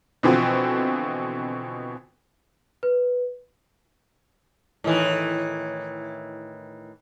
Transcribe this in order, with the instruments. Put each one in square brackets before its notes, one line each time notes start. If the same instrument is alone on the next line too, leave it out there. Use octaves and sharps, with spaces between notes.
[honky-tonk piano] B2 D3 E3 F3 B3 C4
[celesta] B4
[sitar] A2 D#3 E3